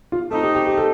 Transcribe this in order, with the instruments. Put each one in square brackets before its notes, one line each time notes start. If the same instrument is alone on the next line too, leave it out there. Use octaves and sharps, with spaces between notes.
[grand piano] F4
[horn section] A3 C4 D#4 [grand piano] A4
[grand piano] G4
G4
G4
A4